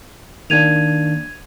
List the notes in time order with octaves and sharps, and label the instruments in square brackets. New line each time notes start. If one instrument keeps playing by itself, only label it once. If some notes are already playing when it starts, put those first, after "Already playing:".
[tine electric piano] D#3 A#3 D4 [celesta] G#6 D#7 F7